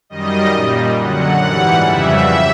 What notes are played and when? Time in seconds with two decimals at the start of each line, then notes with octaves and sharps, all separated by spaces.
0.10 F#2 D#3 G3 D#5
0.53 A#2 G3
0.98 F#2 D3 F#3 F#5
1.41 G#2 E3 G3
1.84 F2 C#3 E3 G3 E5